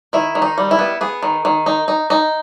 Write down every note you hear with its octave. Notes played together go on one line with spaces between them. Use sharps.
D#3 E4
D#3
D#4
G3
E4
B3
B3 G#4
D#3
D#3
D#4
D#4
D#4